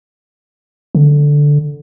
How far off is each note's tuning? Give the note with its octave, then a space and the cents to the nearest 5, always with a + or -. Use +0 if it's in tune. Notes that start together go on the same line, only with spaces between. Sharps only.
D3 -5